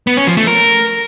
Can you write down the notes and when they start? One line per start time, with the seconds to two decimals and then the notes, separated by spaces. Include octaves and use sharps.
0.07 B3
0.17 C#4
0.27 F3
0.37 A3
0.47 A#4